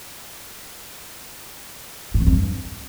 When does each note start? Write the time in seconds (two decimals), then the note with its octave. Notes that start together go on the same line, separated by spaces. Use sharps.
2.14 A2
2.20 E2
2.27 F2
2.33 G2